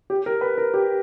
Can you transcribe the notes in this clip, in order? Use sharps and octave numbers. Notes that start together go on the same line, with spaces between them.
G4
A#4
B4
A#4
G4